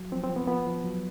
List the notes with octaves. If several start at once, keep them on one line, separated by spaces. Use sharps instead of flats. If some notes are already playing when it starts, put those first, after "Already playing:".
Already playing: F#3
F3 C4
C4
F3
B3
F3 B3
F3
F#3